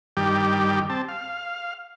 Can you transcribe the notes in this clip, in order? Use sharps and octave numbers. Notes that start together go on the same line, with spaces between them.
G2 D#3 G3 G4
C4 A5
F5